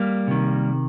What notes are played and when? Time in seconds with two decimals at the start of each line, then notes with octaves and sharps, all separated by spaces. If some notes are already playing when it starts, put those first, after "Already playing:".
Already playing: G3 A#3
0.27 C3 D#3